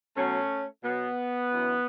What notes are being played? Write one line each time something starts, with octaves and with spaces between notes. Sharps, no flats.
B2 F#3 A3 C#4
B2 F#3 B3
F#2 E3